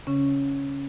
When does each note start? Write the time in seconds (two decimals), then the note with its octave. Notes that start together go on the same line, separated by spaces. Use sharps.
0.07 C#3 C#4